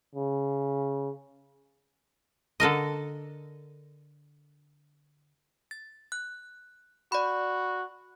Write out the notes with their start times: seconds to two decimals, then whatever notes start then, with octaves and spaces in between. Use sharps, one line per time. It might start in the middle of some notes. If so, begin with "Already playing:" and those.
0.16 C#3
2.60 D3 A4 A#4 D#5
5.71 A6
6.12 F#6
7.12 F#4 D5 B5